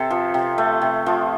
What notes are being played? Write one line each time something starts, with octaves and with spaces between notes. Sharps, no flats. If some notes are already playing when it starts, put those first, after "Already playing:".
Already playing: C3 A4
F3
C3
A3
C3
F3